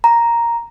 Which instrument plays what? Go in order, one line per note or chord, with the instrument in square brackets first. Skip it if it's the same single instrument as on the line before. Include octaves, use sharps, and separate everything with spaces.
[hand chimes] A#5